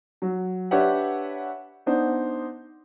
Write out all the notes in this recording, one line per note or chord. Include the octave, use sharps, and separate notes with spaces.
F#3
D4 G4 B4 C#5 E5 F#5
B3 D4 D#4 C5